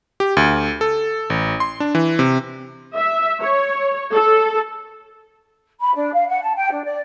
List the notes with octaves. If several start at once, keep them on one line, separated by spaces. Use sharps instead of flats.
G4
D2
A4
A1
C6
D4
E3
C3
E5
C#5
A4
B5
D4
F5
F#5
A5
G5
D4
D5